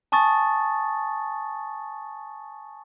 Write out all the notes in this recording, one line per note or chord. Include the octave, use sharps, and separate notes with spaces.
G#5 A5 C#6 D#6 A6